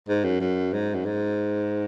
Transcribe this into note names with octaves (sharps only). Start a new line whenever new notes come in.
G#2
F#2
F#2
G#2
F#2
G#2